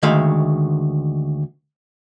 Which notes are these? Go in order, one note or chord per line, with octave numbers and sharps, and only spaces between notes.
D2 D#3 G#3 E5 F5